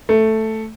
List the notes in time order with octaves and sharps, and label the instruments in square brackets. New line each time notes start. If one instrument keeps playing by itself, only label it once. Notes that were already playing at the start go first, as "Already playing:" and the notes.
[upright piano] A3